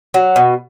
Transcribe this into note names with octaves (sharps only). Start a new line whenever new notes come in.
F#3
B2